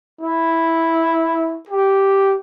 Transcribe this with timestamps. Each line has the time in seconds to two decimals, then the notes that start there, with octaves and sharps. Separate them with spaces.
0.22 E4
1.69 G4